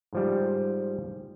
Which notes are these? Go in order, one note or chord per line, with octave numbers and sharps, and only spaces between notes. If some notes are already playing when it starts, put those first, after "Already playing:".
G#2 F3 G3